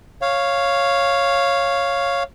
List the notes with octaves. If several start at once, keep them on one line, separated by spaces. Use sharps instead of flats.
C#5 F5